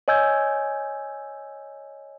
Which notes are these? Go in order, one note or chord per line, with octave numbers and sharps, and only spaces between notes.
C#5 D#5 G#5 E6 G6 G#6